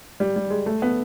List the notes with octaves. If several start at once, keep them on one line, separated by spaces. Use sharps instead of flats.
G3
G3
G#3
A3
B3